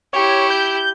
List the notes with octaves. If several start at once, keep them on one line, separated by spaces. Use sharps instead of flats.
E4 G4 C#5
G6